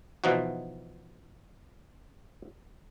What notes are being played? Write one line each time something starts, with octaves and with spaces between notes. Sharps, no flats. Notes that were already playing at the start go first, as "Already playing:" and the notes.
B2 E3 F3 D#4 F#4